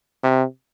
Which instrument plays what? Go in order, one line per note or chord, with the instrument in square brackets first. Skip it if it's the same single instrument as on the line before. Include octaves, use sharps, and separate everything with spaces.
[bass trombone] C3